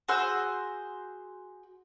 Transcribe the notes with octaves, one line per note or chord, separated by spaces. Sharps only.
F#4 G#4 C5 E6